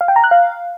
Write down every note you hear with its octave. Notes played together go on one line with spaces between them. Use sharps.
F5
G5
A#5
F#6
F5